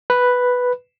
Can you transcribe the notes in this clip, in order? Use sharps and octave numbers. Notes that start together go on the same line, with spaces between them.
B4